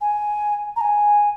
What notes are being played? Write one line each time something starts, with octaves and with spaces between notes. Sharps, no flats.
G#5
A#5
G#5